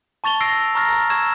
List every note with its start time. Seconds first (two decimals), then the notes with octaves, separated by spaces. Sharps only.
0.24 A5 C#6 A6 F7 G7
0.41 E6 A#6 C7 D7
0.75 A#5 C#6 F6 A6 A#6
1.10 C#6 E6 G#6 E7